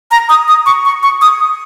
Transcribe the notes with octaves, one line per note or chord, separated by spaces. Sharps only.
A#5
D#6
D#6
C#6
C#6
C#6
D#6